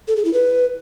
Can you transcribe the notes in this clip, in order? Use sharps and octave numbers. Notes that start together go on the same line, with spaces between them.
A4
G#4
E4
B4